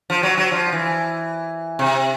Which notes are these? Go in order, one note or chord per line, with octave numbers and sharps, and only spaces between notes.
F3
F#3
F#3
F3
E3
C3